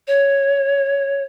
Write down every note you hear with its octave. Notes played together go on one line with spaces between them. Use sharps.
C#5